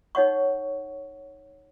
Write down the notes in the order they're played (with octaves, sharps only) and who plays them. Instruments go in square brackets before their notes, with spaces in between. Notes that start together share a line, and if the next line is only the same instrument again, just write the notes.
[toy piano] D#4 C#5 F#5 C#6